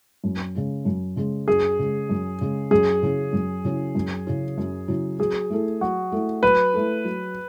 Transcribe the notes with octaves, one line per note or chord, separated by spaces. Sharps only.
F#2
C#3 G#3
F#2
C#3 G#3
F#2 G#4
C#3 G#3
F#2
C#3 G#3
F#2 G#4
C#3 F#3 C#4 E4
F#2
C#3 F#3 C#4 E4
F#2
C#3 F#3 C#4 E4
F#2
C#3 F#3 C#4 E4
F#3 G#4
A3 E4 A4
F#3 F#4
A3 E4 A4
F#3 B4
A3 E4 A4
F#3